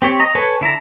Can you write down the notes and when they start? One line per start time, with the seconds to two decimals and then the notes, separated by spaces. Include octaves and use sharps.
0.02 C4 G4 C#5
0.20 D#5 A#5
0.35 A4 B4 C#5 G#5
0.61 D3 E4 A5 A#5